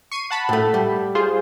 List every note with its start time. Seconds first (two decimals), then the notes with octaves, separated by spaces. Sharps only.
0.11 C#6 C7 D#7
0.30 F#5 A5 B5
0.49 A2 A3
0.74 G3
1.15 F4 G#4 C5